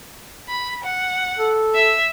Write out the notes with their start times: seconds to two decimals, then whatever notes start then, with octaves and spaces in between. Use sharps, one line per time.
0.49 B5
0.84 F#5
1.39 A4
1.75 E5